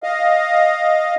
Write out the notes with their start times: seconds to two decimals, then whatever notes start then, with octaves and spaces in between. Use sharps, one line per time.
0.03 D#5 F5